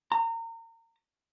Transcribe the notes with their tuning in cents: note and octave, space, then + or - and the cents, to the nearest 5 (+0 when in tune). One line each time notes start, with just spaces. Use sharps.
A#5 -30